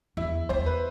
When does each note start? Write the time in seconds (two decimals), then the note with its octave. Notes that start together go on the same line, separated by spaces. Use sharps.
0.17 E2 E4
0.49 E2 C5
0.66 B4